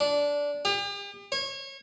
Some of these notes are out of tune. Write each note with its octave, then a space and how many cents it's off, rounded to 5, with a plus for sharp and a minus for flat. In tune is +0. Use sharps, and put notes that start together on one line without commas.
D4 -15
G4 +40
C#5 -30